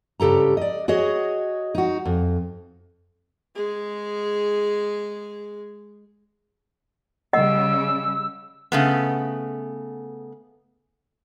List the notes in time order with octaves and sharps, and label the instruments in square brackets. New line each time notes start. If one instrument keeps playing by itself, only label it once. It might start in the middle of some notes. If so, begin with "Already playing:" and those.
[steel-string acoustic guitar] G2 C#3 G4 A4 A#5
D5 D#5
F#4 G#4 C#5 D#5
D#4 F#4
F2
[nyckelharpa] G#3 G#4
[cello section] C#3 G3 [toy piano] D#5 F#5 [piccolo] E6
[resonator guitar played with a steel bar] C#3 A3 B3